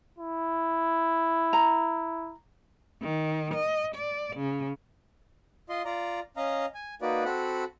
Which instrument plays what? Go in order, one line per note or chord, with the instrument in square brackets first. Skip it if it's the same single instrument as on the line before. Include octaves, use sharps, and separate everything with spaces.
[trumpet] E4
[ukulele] A#5
[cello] D#3
D#5
D5
C#3
[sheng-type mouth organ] F4 D#5 C6
F4 D5 A#5
C#4 D#5 F5 A#5
G#5
A#3 D#4 F#4 B4 D5
C4 F#4 A4 F#5 B5